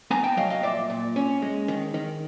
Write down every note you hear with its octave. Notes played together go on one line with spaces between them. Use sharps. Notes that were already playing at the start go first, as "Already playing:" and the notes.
B3 G#5 A#5
G5 A5
F#3 D#5 F5
D#5 F5
A#2 D5 E5
A#2
C#4
G#3
D#3
D#3